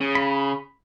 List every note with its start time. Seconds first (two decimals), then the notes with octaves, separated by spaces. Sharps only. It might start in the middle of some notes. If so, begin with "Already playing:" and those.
0.01 C#3
0.15 B5